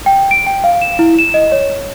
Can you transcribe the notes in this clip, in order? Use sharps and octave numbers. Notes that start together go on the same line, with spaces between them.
G5
D7
G5
F5
E7
E4
E7
D#5
C#5